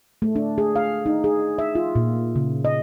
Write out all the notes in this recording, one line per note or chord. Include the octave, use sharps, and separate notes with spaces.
A3
D4
G#4
F5
D#4
G#4
E5
F4
A#2
C#3
D#5